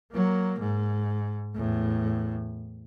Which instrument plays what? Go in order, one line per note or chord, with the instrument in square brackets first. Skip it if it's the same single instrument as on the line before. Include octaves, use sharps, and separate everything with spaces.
[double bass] F#3 A#3
G#2
E2 A2